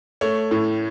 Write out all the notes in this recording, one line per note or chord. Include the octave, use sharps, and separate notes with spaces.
A3 C#5
A2